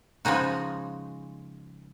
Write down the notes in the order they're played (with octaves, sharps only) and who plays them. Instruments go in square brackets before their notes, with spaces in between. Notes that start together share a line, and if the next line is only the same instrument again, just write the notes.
[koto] C#3 F3 G#3 D#4 F#4